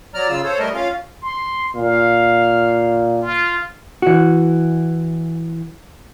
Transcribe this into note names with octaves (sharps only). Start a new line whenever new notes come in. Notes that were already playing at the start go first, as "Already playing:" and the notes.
F#3 D5 A#5 F6
C#3 F4 E6
A4 C5 C#5
G3 A3 A#4 D#5
C#4 F4 F5
C6
A#2 F5
F4
E3 F#4